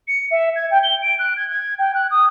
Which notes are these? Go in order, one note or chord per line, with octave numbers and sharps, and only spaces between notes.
C#7
E5
G#6
G5
G7
D7
F#6
G#6
G#6
G5
F#6
D#6